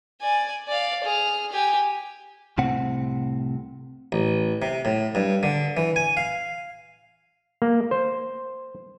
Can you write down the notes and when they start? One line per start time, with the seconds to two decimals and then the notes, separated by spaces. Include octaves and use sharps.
0.21 D5 G#5
0.68 D5 F5
1.03 G#4 F6
1.51 G4 G#5
2.58 C2 A2 C3 C4 F#5
4.12 A1
4.62 C3
4.85 A2
5.15 G2
5.43 D3
5.77 E3
5.96 G#5
6.17 F5
7.62 A#3
7.91 C5